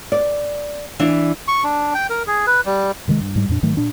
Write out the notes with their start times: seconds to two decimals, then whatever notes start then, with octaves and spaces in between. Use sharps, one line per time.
0.12 D5
0.99 E3 D4
1.48 C#6
1.64 D4
1.94 G5
2.10 A#4
2.27 G#4
2.47 B4
2.65 G3
3.08 C3 D#3 E3 G#3
3.21 G2
3.35 G#2 G3
3.49 F2 A#2 D4
3.63 G#2 D#3 F#3 A3
3.77 A#2 D4